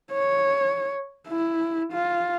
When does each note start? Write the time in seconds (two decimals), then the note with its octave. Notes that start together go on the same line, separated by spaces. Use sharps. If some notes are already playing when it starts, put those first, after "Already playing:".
0.13 C#5
1.28 E4
1.93 F4